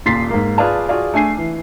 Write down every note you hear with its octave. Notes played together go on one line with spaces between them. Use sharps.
D#1 A#2 C6 A6 B6 C7
G#2 A#3
F4 G#4 B4 D5 F5 A5
F4 F#4 G#4 D5 F5
A3 D4 G#5 C7
E3